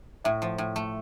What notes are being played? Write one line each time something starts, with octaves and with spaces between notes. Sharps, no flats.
A2 E5
F3
A2
A3